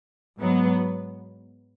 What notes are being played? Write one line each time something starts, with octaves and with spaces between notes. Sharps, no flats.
G#2 F#3 B3